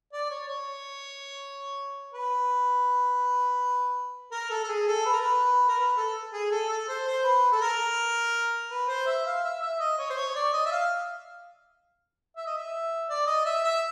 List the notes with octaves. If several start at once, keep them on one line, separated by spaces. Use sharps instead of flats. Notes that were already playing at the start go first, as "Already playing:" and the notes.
D5
C#5
C#5
B4
A#4
A4
A4
G#4
A4
B4
A#4
B4
A#4
B4
A4
G#4
A4
A4
C5
C5
B4
A4
A#4
B4
C5
E5
F5
E5
E5
D#5
C#5
C5
C#5
D5
D#5
E5
F5
E5
D#5
E5
D5
D#5
E5
E5